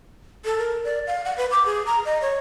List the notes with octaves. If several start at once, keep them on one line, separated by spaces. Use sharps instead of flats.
A4
A#4
D5
F5
F#5
B4
D6
G#4
A#5
D#5
C#5